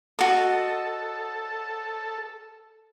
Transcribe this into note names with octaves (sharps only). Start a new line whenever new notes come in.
F#4 A4 D#5